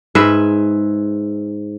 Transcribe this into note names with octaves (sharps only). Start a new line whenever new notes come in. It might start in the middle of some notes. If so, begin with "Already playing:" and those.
G#2 G#4 B4 E5